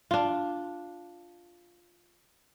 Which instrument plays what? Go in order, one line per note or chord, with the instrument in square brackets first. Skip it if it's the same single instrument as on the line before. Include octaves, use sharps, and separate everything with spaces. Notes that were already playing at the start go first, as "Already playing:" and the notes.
[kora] D4 F4